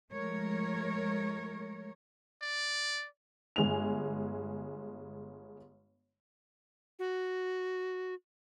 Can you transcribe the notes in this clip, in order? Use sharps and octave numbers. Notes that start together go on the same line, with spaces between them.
F3 G#3 A3 A#4 C#5
D5
G1 G#3 G#5 F7
F#4